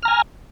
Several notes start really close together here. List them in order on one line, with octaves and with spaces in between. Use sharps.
F6 A#5 G#5